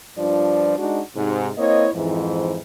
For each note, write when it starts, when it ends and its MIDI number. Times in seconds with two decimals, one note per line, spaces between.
0.18 0.77 43
0.18 0.77 53
0.18 0.77 62
0.18 0.77 65
0.18 0.77 74
0.78 1.01 56
0.78 1.01 62
0.78 1.01 63
0.78 1.01 66
1.16 1.50 44
1.16 1.50 48
1.58 1.88 58
1.58 1.88 60
1.58 1.88 64
1.58 1.88 73
1.58 1.88 75
1.94 2.61 41
1.94 2.61 44
1.94 2.61 52